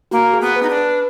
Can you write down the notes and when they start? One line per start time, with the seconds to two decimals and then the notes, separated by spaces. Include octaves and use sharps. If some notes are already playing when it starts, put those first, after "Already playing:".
0.11 A#3 F#4
0.34 G#4
0.41 B3
0.56 B4
0.63 D#4
0.70 D4
0.77 B4